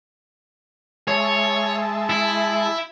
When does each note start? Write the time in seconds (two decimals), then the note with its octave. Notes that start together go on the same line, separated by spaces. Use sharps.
1.08 G#3 C#5 E5 A5
2.09 E4